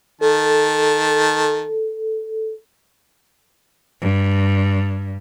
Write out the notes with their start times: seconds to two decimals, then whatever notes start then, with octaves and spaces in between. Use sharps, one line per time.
0.21 D#3 A4 A5
4.02 G2